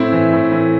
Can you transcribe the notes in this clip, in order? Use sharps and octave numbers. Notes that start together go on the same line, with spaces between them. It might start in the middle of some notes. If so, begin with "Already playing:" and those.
Already playing: A2 C4 E4
E3
A2
E3